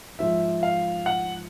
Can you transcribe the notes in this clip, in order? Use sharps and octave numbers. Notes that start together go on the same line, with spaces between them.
G#2 F3 E5
F5
F#5